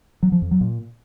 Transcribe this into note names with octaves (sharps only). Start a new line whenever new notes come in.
F#3
F3
F2
F#3
A#2